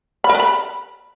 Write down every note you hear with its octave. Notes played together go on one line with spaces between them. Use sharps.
B5
A#4
B4
B5